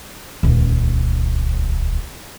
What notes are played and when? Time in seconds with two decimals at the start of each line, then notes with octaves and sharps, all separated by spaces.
0.43 D#1 C#2